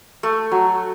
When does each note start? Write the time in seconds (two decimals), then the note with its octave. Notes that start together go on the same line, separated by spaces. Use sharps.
0.23 A3
0.52 F#3